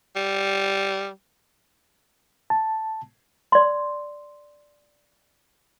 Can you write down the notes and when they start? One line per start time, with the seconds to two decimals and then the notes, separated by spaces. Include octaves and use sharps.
0.16 G3
2.50 A5
3.52 D5 C6